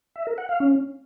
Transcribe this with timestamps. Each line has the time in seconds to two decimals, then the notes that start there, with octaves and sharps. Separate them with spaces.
0.16 E5
0.27 A#4
0.38 F#5
0.49 F5
0.60 C#4